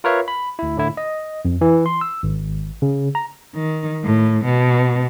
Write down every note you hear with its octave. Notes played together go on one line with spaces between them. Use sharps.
F4 A#4 B4 C#5 E5 F5
B5
D2 E4
A2 D3 E4
D#5
F2
E3
C6
E6
G#1
C#3
A#5
D#3
A2
B2